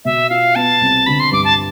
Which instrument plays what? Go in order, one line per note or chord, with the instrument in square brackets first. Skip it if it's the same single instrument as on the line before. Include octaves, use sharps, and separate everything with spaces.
[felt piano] B2 [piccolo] E5
[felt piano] F4 [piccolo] F5
[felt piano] B3 [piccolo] A5
[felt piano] C2
[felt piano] D3 [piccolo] B5
[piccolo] C6
[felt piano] G2 [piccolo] D6
[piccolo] A5